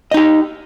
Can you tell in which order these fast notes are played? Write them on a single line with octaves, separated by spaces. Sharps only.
D#5 D#4 G4